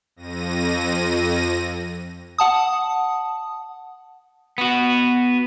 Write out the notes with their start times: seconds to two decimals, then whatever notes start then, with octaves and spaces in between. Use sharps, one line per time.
0.16 F2 A#6 D#7
2.38 F#5 A5 D#6
4.58 B3 F#4